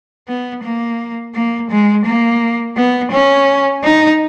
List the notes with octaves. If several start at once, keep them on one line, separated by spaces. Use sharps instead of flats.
B3
A#3
A#3
G#3
A#3
B3
C#4
D#4